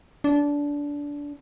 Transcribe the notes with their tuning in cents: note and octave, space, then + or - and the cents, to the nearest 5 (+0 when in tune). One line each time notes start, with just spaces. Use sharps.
D4 -20